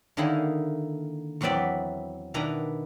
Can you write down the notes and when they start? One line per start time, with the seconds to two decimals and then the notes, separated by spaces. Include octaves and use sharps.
0.17 D3 D#3 A#3 D#4 E4 G#4
1.41 E2 F#3 C4 B4 D5 E5
2.34 B2 D#3 D4 E4 B4 A#5